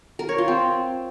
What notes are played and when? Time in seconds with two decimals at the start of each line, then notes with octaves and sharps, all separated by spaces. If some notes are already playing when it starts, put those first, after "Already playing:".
0.19 A#4
0.29 C#5
0.38 F4
0.48 C4